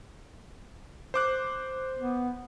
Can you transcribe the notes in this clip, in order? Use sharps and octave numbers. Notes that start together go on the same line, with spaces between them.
C5 D6 F#6
B3